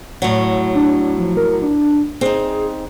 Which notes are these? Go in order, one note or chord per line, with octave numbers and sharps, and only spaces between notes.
A2 F#3
D4
F3
A#4
D4
C4 D#4 G#4